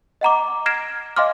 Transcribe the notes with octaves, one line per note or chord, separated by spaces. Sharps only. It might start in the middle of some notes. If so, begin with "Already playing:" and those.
D#5 F#5 A#5 D6
F6 G#6 A#6 C7 D7 E7
D#5 F5 G#5 C6 D6 F6